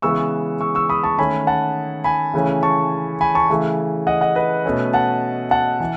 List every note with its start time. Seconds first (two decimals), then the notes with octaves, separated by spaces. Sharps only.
0.02 C#3 E3 G#3 B3 C#6 E6
0.61 C#6 E6
0.75 C#6 E6
0.89 B5 D#6
1.03 A5 C#6
1.18 D#3 A3 C#4 G#5 B5
1.47 F#5 A5
2.04 G#5 B5
2.34 C#3 E3 A3 C#4
2.63 A5 C#6
3.21 G#5 B5
3.35 A5 C#6
3.49 C#3 E3 A3
4.07 D#5 F#5
4.21 D#5 F#5
4.35 B4 D#5
4.65 B2 A3 C#4
4.93 F#5 A5
5.51 F#5 A5
5.80 E3